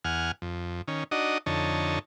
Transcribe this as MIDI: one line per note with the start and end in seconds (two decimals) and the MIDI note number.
0.05 0.31 40
0.05 0.31 78
0.05 0.31 80
0.05 0.31 89
0.42 0.82 41
0.88 1.04 51
0.88 1.04 61
1.11 1.38 62
1.11 1.38 63
1.11 1.38 66
1.11 1.38 75
1.46 1.99 41
1.46 1.99 50
1.46 1.99 63
1.46 1.99 73
1.46 1.99 81